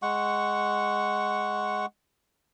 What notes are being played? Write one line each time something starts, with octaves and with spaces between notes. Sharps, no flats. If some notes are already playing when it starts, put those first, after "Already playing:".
G#3 F#5 C#6